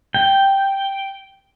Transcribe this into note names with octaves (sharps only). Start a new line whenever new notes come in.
G5